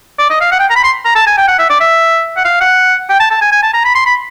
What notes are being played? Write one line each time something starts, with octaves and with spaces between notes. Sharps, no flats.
D5
D#5
F5
F#5
G5
A#5
B5
C6
A#5
A5
G#5
G5
F#5
E5
D5
E5
F#5
F5
F#5
G5
A5
A5
G#5
G#5
A5
A#5
B5
C6
B5